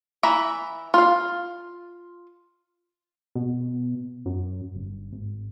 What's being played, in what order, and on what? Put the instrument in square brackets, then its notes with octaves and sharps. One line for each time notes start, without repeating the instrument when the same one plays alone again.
[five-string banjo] E3 E5 A#5
F4 F5
[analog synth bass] B2
F#2
G1
G#1